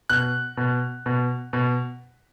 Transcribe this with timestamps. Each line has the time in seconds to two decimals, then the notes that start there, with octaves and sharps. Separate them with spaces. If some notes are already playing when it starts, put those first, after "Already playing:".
0.10 B2 F#6
0.57 B2
1.06 B2
1.53 B2